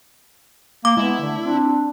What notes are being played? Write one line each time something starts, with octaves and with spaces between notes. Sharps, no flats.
A#3 D6
G#3 B3 E4
D3 A3
C4 D4